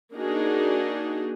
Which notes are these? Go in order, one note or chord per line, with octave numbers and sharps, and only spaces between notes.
A#3 D4 D#4 F#4 G#4